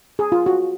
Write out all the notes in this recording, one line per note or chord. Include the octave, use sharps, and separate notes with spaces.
G#4
F4
F#4